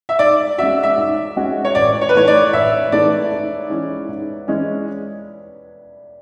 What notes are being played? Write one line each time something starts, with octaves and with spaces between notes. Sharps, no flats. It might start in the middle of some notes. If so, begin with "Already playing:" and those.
E5
G#2 D5
G#3 C#4 F#4 E5
E5
G#2
G#3 C#4 F#4
C#5
A1 D5
C#5
B4
G#2 E3 A3 C#5
D5
A1 E5
G#2 E3 A3 D5
G#2
E3 G#3 C#4
G#2
E3 G#3 C#4